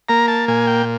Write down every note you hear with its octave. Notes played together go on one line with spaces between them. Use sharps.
A#3 A#5
A5
A#2 G#5
G5